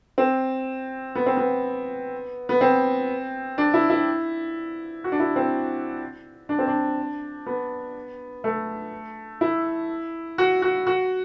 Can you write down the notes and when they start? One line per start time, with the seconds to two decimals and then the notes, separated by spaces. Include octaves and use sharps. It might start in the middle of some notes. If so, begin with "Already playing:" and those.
0.18 C4
1.15 B3
1.26 C4
1.37 B3
2.49 B3
2.61 C4
3.58 D4
3.74 E4
3.90 E4
5.04 F#4
5.12 D4
5.20 E4
5.36 C4
6.49 D4
6.59 C4
6.68 D4
7.46 B3
8.44 A3
9.41 E4
10.38 F#4
10.62 F#4
10.87 F#4